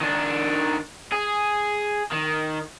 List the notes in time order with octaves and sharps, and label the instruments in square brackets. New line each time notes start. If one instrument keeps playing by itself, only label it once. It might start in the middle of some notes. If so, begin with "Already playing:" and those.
[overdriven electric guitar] D#3 D4
G#4
D#3